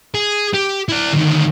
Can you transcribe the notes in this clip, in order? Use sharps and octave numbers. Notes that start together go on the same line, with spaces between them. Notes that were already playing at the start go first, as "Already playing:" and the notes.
G#4
G4
E4 D5
D2 D#3